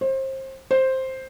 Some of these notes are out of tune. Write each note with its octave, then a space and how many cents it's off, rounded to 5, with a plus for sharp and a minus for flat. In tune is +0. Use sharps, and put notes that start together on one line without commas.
C5 +30
C5 +5